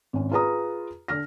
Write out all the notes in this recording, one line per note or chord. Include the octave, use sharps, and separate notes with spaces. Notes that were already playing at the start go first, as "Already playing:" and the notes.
G#1 C#4
F4 G#4 B4 A#5 D#6
D3 F6 A#6